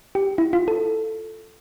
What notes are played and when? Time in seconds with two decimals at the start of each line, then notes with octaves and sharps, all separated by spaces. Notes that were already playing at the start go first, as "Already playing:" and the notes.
0.15 G4
0.38 E4
0.53 F4
0.68 A4